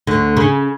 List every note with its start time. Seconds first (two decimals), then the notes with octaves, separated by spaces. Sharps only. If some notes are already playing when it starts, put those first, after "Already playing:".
0.07 D2 D3
0.37 C#3